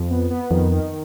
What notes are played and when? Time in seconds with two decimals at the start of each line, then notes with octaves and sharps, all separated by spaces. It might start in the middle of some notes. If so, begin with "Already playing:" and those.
Already playing: F2
0.10 B3
0.30 B3
0.50 F2 D#3
0.71 D#3